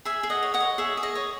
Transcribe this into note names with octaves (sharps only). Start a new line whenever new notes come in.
G#4 E5 G#5
G#4
D#5 F#5
C#5
D#5 F#5
C#5
G#4 E5
G#4
D#5
C#5